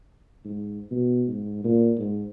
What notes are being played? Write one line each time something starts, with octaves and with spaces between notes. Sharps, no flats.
G#2
B2
G#2
A#2
G#2